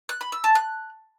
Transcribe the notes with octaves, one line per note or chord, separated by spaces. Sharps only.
F#6
B5
E6
A5
F#6